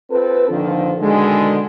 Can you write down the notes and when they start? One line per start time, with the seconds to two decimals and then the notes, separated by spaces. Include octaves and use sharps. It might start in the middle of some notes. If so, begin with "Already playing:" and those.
0.10 C4 F4 A4 B4
0.49 A#2 D3 D#3 F3
1.00 B2 D3 D#3 G#3